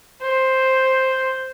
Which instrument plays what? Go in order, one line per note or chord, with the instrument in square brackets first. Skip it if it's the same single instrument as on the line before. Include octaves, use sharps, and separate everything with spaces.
[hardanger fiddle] C5